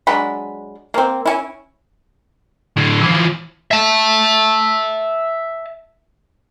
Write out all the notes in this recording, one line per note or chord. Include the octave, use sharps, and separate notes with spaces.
F#3 G#3 D4 B5
A#3 C4
C#4 E4
A2 D3
E3 F3
E5 A5